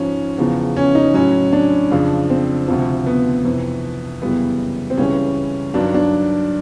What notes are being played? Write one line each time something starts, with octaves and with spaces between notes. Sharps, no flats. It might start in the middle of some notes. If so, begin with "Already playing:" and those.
Already playing: G#2 F3 C#4
E2 C#3 F3
C#4
D#4
A2 F#3 C#4
D4
F2 C#3 F3
C4
D2 C3 F3
B3
F2 C3 E3
F#2 C#3 E3 G3 B3
C4
C#2 C#3 E3 G3 C#4
G2 D#3 F#3 D4
D4